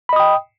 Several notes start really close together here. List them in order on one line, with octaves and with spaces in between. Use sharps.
B5 D#5 D#6 G5